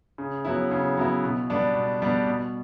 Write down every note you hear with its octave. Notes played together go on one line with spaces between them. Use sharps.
C#3
F#3 B3 E4
C#3
F#3 B3 E4
B2
G3 B3 D4
B2
G3 B3 D4
B2